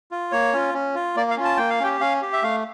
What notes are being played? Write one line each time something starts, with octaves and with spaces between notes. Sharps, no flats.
F4
A#3 C#5
C#4 F4
C#4
F4
A#3 D5
F5
C#4 F4
A5
A#3 G5
F5
C#4 G4 G5
C#4 F5
G4
E5
A3 F5